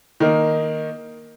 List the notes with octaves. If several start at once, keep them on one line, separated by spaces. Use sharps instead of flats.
D#3 A#3 D#4